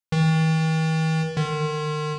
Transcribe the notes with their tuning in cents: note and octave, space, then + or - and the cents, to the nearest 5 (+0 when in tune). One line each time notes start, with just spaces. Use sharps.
D#3 +45
D#3 -40